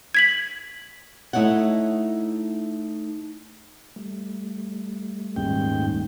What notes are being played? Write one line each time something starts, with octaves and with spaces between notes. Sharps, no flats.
G#6 B6 F#7
A3 D#4 E4 C#5 F#5
G3 A3
D#1 D#2 G#2 G5